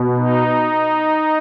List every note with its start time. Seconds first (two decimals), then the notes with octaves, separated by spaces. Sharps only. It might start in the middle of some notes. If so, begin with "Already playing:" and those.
Already playing: B2
0.17 D#4